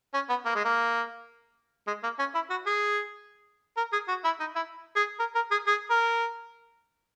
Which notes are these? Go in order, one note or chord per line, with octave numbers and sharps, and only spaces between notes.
C#4
B3
A#3
G#3
A#3
G#3
A#3
C#4
E4
F#4
G#4
A#4
G#4
F#4
E4
D#4
E4
G#4
A#4
A#4
G#4
G#4
A#4